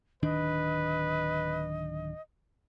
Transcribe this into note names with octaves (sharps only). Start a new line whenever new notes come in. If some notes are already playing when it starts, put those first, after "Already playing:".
D1 D#3 D4 B4 D#5